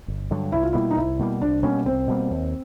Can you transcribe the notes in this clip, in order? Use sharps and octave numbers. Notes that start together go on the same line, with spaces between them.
G1
G2 D3 F#3
C2 E4
F4
B2 G3 A#3 E4
D#4
C2 E4
B2 G3 A#3
C2 D4
B2 G3 A#3 C#4
C2 C4
B2 G3 A#3
D#2